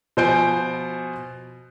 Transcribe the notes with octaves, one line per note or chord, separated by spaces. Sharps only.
B2 F3 C5 G#5 G6 D7